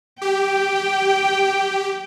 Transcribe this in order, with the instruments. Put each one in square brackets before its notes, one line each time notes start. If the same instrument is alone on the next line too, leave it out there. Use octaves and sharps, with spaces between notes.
[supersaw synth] G4 [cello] G5